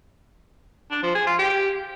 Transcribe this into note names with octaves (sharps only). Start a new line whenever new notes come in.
D4
F3
G#4
F4
G4